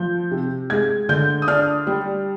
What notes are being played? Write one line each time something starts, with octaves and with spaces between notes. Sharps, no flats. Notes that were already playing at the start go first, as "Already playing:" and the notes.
Already playing: F3 G6
C3
G#3 G#6
D3 G6
D#6
D4 F6
G3